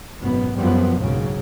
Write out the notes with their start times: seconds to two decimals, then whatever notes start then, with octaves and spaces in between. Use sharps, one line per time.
0.22 G#1 F#2 B2 B3
0.57 F#2 F3 G3 B3 C4
0.98 F#1 B1 G#2 C#3 F#3